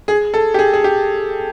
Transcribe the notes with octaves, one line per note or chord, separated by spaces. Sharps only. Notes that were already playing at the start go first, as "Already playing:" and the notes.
G#4
A4
G4
G#4
G#4
G4